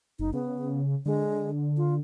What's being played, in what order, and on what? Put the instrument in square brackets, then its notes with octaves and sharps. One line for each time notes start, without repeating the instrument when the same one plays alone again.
[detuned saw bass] F#1 [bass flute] D#4
[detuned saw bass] C#3 [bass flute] B3
[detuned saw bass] D3 [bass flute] G#3
[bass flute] F4